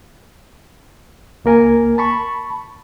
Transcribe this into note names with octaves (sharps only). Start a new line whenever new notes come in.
C#2 A#3 A#4 G#5
A5 B5 C#6